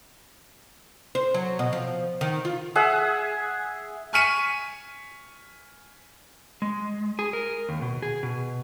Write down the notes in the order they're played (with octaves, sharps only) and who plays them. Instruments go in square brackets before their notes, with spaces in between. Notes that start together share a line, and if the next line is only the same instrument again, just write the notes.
[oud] C5
F#3
B2
F3
D#3
F4
[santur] G#4 E5 F#5
[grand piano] G#5 C#6 F6 B6 C#7 D#7
[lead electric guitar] G#3
G#4
A#4
D#2
B2
G#4
B2